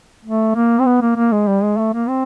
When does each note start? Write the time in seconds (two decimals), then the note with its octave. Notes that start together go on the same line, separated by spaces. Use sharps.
0.25 A3
0.55 A#3
0.79 C4
0.85 B3
1.01 A#3
1.16 A#3
1.32 G#3
1.47 G3
1.63 G#3
1.78 A3
1.93 A#3
2.08 C4